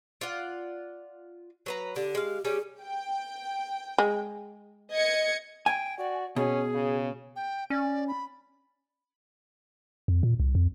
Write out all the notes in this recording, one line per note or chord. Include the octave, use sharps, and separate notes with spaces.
F4 D5 F#5
F#3 B4 A#5
D3 G4
G#3 F5
G3 C#4 G4 G#4
G5
G#3
D#5 G#6 C#7
G5 G#5
F#4 D5
B2 C#4 G#4
C#3
G5
C#4 D5
B5
F2
A#2
C2
F2